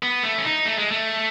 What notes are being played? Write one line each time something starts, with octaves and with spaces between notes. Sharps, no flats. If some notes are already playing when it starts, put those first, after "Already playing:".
B3
A3
C#4
D#4
A3
G#3
A3